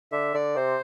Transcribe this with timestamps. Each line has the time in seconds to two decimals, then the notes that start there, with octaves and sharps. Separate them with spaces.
0.12 D3 E5
0.34 D3 D5
0.56 C3 C5